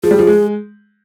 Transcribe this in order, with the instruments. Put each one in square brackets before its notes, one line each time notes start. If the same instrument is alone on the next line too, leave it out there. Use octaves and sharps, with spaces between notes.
[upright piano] F3 [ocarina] G#4
[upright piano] G3
F3
G#3